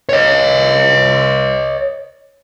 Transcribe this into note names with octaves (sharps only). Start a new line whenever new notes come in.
C#5 D#5